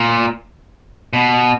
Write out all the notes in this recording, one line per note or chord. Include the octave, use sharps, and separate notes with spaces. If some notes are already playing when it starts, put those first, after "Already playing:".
Already playing: A#2
B2